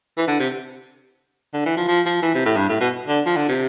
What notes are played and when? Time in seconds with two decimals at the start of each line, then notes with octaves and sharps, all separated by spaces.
0.17 E3
0.28 D3
0.40 C3
1.54 D3
1.66 E3
1.77 F3
1.88 F3
2.06 F3
2.22 E3
2.35 C3
2.46 A2
2.56 G2
2.69 A2
2.81 B2
3.08 D3
3.26 F3
3.37 D3
3.49 C3